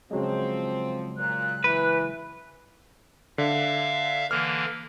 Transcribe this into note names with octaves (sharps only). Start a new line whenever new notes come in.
C#3 F3 F#3 G#3 C4
A#2 F#6
E3 B4
D3 E5 F5
D3 E3 A#3 F6